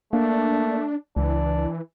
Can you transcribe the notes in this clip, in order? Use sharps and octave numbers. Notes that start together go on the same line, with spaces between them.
A3 A#3 D4
C#2 E3 D4